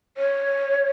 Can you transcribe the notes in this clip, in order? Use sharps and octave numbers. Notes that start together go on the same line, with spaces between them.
C#5